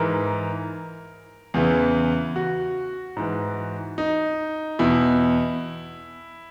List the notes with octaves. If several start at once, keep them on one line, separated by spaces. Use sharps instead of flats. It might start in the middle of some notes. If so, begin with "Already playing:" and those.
Already playing: G#2 E3 A#4
E2 C#3 E3
F#4
G#2 E3
D#4
E2 B2 E4